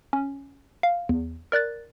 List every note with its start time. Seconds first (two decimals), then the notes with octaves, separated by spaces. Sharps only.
0.13 C#4
0.83 F5
1.09 E2
1.52 A#4 D5 F#6 A6